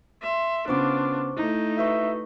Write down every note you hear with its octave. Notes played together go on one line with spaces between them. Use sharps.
E5 C6
C#3 B3 D4 F4 C5 C#6 D6
A3 D#4 E4
F#4 B4 E5 C#6